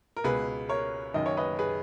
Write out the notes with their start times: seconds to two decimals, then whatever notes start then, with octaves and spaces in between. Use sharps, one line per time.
0.17 A#4
0.24 C#2 B2 G#4 B4
0.69 A#4 C#5
1.14 F#1 F#2 D#3 D#5
1.26 C#5
1.37 B4 D#5
1.59 G#4 B4